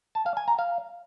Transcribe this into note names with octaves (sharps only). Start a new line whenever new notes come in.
A5
F5
G#5
A#5
F5